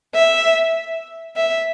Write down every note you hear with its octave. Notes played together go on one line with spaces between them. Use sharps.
E5
E5